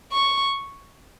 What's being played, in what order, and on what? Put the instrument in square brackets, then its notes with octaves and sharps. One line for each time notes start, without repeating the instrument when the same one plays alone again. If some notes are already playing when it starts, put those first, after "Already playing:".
[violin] C#6